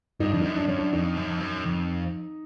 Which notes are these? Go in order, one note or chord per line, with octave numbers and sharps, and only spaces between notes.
G2 D#4
F2 D4
F#2 D#4
D4
F#2 C#4
D4
F2 D#4
F#2
F2
F#2
F2